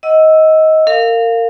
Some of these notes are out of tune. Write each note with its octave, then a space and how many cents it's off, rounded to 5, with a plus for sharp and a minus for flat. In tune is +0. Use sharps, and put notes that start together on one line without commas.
D#5 +20 F#5 +20 E6 +0
A#4 -30 F5 +0